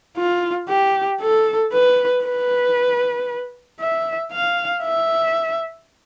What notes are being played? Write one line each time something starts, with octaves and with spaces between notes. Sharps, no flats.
F4
G4
A4
B4
B4
E5
F5
E5